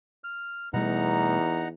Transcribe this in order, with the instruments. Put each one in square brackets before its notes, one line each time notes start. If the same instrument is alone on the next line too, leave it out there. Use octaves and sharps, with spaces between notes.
[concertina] F6
[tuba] E2 [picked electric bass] B2 G3 A3 [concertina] D#4 F#5 A#5